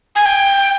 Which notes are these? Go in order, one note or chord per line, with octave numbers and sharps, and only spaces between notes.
G#5
G5